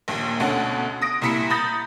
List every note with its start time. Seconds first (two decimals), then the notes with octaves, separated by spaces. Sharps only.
0.08 A#1 D#2 A#2
0.40 D2 B2 D3 C#4
1.02 D#6 A#6 D7
1.22 C2 A#2 E4 B6 C#7
1.50 A#5 B5 D#6 G6 A6 A#6